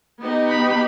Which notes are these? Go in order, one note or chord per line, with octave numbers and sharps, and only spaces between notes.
B3 D#4 G4
B5